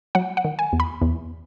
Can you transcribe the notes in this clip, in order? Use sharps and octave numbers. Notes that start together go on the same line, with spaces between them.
F#3 F#5
F#5
D#3
G#5
E2
B5
E2